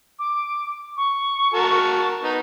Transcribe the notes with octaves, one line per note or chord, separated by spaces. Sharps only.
D6
C#6
F#4 A#4 A5
B3 D#4